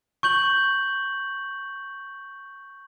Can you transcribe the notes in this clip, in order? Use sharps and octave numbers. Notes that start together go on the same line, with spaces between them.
C#6 G6 F#7